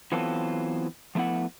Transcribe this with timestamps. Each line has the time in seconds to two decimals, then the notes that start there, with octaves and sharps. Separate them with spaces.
0.12 E3 F#3 B3 C4 F4 A4
1.15 F3 A3 B3 E4 F#5